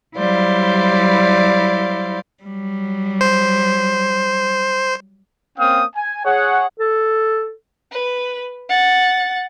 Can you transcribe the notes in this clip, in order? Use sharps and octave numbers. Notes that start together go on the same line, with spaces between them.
F#3 G3 E4 C5 D5 F5
F#3 G3
C5
A#3 C4 C#4 F5 G5 D#6
G#5
G#4 C#5 F#5
A4
B4
F#5 A6